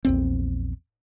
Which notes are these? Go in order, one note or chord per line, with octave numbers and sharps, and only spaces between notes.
A#1 E2 C4